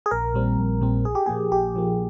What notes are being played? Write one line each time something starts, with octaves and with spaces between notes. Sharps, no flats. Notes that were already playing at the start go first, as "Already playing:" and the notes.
G#4
A#1 A#4
A#2 G3 C4
A#1
A#2 G3 C4
A#1 G#4
G4
A#2 F3 A#3 G#4
A#1 G4
A#2 F3 A#3